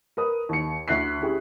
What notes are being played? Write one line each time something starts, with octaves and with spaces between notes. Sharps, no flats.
A#4 B4 D#6
D#2 C#7
D2 E5 F#6 B6 C7
C#4 E4 G4 G#4